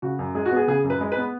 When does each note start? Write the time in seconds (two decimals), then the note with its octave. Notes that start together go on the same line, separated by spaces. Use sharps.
0.02 C#3 F#4
0.19 F#2
0.35 G#3 G#4
0.45 F#4
0.52 B3 G#4
0.68 C#3 G#4
0.84 F#2
0.90 B4
1.01 G#3
1.12 B4
1.17 B3